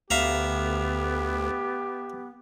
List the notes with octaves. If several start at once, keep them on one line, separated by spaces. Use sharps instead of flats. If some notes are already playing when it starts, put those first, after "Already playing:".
D2 B3 G4 E5 F5 A#5